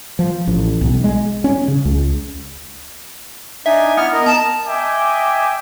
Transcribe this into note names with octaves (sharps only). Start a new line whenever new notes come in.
F3
A1
B1
G#3
C#4
C#3
C#2
D4 D#4 E5 G#5
B3 E4 F6
A#4 D#5
A5 A#5
D#5 E5 G5 G#5 D6